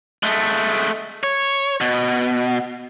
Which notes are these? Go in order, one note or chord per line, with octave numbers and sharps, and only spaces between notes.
G#3 A3
C#5
B2